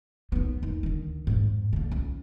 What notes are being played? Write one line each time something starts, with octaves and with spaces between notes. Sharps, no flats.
D#2 B3
D#2
D2 D#3
F2 G#2
D3 A#3
C#2